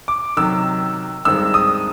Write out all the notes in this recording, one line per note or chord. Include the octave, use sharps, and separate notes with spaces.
D6
C3 D#3 F#3 E6
G2 D#3 G#3 C4 E6
D#6